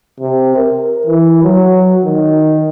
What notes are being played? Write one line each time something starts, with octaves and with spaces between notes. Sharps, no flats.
C3
A#4
E3
F#3
D#3